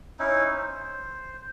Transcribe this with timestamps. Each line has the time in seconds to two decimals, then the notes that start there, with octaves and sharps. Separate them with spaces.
0.19 C#4 D#4 E4
0.55 C5